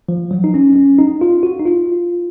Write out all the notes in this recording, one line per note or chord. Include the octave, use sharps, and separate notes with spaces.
F3
F#3
D#4
C#4
C#4
D#4
F4
F#4
D#4
F4